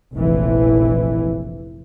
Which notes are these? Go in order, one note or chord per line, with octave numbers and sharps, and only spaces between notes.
F1 A#1 E3